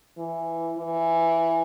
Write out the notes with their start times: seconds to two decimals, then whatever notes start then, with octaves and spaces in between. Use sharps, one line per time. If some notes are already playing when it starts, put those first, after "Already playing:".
0.18 E3
0.78 E3